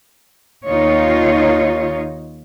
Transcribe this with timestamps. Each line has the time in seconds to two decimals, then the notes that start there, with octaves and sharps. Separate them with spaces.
0.67 D#2 D#3 D#4 F4 C#5